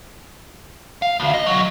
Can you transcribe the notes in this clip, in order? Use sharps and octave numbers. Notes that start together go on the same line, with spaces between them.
F5
D2
D#5
B1 F#3